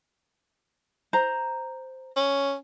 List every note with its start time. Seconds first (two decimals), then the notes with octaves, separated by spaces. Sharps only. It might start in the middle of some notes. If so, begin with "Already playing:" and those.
1.13 C5 A#5
2.16 C#4